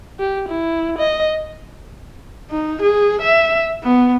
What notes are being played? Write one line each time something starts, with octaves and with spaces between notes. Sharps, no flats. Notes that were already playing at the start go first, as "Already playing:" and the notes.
G4
E4
D#5
D#4
G#4
E5
B3